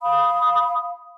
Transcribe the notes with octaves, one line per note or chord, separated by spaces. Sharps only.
F5 B5 D#6